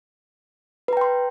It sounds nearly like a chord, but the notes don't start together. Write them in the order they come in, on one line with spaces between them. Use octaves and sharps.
B4 A#5 G5 C6